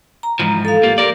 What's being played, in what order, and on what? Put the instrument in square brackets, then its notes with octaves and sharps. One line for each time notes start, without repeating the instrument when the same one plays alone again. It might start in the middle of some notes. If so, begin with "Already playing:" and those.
[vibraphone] A#5
[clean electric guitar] G#2 E3 F3
[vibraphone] A4 F5
[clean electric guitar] A#3 F4 [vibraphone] G4
[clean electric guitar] A#4 D5